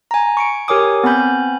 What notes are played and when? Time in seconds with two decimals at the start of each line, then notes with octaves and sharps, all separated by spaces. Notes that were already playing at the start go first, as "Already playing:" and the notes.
0.11 G#5 A#5
0.37 C#6 C#7 D7
0.68 G4 A#4 C#5 G#5 D6 D#6
1.04 B3 C4 G#5 B5 G6